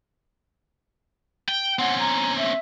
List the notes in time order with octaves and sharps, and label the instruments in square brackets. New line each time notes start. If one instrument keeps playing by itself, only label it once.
[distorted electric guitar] G5
[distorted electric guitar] C4 C#4 [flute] F#5
[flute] A#5
E5